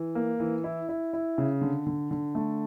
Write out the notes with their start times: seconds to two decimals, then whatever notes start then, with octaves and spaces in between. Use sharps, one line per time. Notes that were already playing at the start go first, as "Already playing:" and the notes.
Already playing: E3
0.15 A#3
0.40 E3
0.64 E4
0.89 E4
1.13 E4
1.38 C#3
1.61 D3
1.87 D3
2.11 D3
2.35 A3